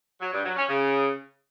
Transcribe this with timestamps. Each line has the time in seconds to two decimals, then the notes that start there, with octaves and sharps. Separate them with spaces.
0.21 F#3
0.33 G2
0.45 F#3
0.56 C#4
0.68 C#3